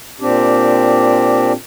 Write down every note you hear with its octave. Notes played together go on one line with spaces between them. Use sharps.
A#2 C4 D4 G4